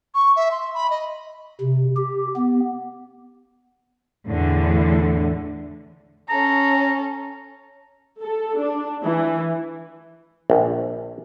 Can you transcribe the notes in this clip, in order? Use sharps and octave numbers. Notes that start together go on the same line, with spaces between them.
C#6
E5
C6
B5
D#5
C3
G4
B3
E2 A2 D3
C#4 A4 A#5
A4
D4
E3
A#1